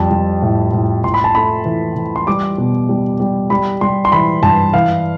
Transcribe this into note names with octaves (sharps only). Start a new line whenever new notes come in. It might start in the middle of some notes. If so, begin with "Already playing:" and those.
Already playing: F2 G3 A5
G3
A2
A2
A2 C6
B5
A5
A3 B5
E3
E3
C6
G3 D6
B2
G3
G3
G3 B5
G3 C6
C6
E3 B5
G2 A5
E3 F5